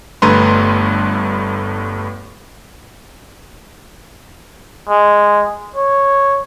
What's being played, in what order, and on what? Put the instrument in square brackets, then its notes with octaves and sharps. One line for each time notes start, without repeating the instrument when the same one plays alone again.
[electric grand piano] G1 G2 A3 B4 A#5 C6
[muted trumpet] G#3
C#5